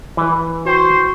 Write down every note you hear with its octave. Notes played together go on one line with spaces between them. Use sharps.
E3 B4
F#4 C5 G5 C#6